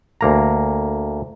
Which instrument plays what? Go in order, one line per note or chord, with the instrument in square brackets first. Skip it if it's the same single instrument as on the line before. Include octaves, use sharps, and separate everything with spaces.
[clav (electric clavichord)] D2 A#3 A#5